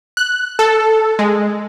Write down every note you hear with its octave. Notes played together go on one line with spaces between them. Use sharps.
F#6
A4
G#3